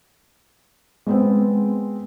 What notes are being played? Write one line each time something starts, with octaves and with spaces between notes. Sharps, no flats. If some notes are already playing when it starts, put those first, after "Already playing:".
G#3 B3 C4